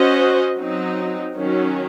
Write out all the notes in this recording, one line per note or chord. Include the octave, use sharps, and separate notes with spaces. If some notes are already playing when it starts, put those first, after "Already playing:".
Already playing: C#4 F#4 C5 D#5
F#3 C4 D#4
D#3 F#3 C#4